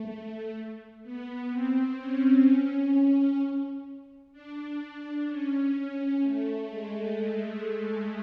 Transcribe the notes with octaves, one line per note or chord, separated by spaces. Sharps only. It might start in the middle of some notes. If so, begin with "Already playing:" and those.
Already playing: A3
B3
C4
C#4
C#4
D4
C#4
C#4
A3
G#3